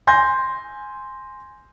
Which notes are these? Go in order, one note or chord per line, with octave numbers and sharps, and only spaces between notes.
G#5 C6 G6 A#6